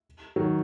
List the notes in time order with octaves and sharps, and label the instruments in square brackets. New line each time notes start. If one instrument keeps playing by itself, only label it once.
[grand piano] D#3 F#3